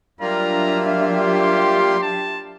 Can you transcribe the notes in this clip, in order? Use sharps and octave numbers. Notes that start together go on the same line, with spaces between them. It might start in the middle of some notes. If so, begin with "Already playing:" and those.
F#3 G3 A#3 D4 F4 E5 A#5
G4 C6
A5